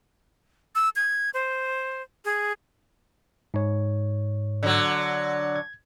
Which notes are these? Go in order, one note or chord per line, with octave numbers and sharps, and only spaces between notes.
E6
G#6
C5
G#4
G#2 C#5
D3 F#3
G#6